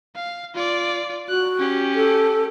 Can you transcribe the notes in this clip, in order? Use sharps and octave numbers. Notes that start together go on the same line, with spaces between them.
F5
F4 D5
F#4 F#6
C#4 G4
A4